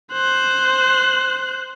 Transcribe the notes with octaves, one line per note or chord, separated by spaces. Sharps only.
C5 F#6